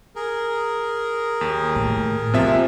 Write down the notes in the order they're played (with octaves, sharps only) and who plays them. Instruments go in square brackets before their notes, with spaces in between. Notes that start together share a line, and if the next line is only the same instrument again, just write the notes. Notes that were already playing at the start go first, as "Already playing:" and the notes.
[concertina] G#4 A#4
[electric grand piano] D#2
[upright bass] A2
[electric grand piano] C3 F3 E5 [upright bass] C4